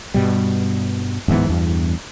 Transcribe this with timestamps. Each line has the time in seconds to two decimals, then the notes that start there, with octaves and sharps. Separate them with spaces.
0.14 G2 B2 G3
1.28 D1 G#2 E3 B3
1.50 E2 G2